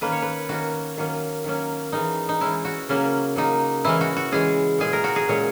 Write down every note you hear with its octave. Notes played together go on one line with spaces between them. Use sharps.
D#3 A#3 C#4 B4
C#5
B4
D#3 A#3 C#4 F#4
D#3 F#3 A#3 C#4
D#3 F#3 A#3 C#4
E3 G#3 C#4 D#4
D#4
E3 G#3 C#4 E4
F#4
C#3 F#3 A#3 C#4
C#3 F#3 A#3 D#4
E3 G#3 C#4 E4
F#4
F#4
E3 G#3 C#4 G#4
A#2 G#3 C#4 G#4
A#4
F#4
G#4
A#2 G#3 C#4 C#5